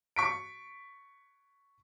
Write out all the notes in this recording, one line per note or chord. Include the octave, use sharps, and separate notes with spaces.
C#6 B6 D7